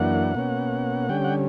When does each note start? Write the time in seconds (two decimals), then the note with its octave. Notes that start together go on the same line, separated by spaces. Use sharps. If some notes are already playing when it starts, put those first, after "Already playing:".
Already playing: F#2 E3 A#3 D4 F#5
0.35 B2 A#3 C#4
1.09 D3 G3 C#4 G5
1.24 F#5